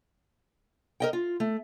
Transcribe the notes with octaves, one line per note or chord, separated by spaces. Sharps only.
A#4 D#5 G5
F4
A3